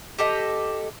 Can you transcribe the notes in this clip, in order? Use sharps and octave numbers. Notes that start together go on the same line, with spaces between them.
G4 A4 D#5